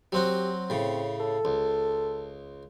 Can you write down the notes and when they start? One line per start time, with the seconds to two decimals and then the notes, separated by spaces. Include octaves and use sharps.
0.12 F#3 C4 F#4 G4
0.70 A2 C#3 C4
1.20 A4
1.45 C#2